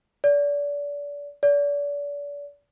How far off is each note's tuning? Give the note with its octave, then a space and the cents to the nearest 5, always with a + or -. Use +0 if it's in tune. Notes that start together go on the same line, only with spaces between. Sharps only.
D5 -30
D5 -35